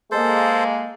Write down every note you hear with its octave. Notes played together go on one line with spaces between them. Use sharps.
G#3 A#3 G#4 A4 C5